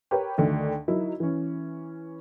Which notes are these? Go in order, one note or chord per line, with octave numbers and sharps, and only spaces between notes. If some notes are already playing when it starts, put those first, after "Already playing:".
G4 A#4 B4 C#5
D2 D3 D#3
F#3 D#4 E4 A#4
E3 C#4